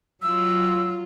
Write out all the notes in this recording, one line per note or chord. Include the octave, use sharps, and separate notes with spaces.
F#3 F4 E6